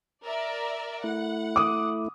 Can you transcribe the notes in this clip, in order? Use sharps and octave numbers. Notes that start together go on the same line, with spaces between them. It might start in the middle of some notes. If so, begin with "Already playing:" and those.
A#4 D5 E5
A3 E4 F#5
D6 D#6